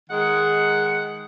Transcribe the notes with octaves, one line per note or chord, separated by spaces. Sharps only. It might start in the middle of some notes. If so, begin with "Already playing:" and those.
D#3 G#3 F#5